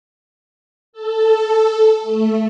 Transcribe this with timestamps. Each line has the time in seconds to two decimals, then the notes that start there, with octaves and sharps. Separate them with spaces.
0.93 A4
2.02 A3